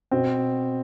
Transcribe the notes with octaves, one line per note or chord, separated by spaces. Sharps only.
B2 C4